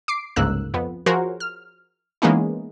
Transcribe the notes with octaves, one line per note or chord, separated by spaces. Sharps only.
D6 C7 D7
G1 C#2 G#2 A#3 E6 F#6
F2 B3
F3 F#4 G#4 A#4 C5 C#5
F6
E3 G#3 A#3 B3 C#4 D#4